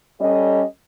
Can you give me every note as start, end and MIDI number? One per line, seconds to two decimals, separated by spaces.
0.21 0.62 55
0.21 0.62 61
0.21 0.62 69
0.21 0.62 75